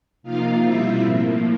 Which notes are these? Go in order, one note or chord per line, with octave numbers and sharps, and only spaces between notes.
C3 F3 A#3 D#4 F4 F5
B2 G3 C4 E4 F4 E5
A2 F3 A#3